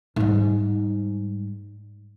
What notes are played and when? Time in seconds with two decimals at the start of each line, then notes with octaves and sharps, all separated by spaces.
0.16 G#2 G3